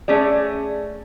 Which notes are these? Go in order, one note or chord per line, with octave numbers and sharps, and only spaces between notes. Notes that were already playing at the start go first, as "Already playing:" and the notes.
A3 C#4 G#4 D5